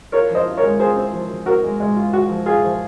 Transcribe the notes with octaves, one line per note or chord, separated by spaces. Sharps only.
F4 A#4 C#5
F3
C5 D#5
F4
A#4 C#5
G#3
F4 G#4 C5
C4
F3
F3
C4 F#4 A#4
G#3
G#3
F4
F4 F#4
F3
F4 G#4
F3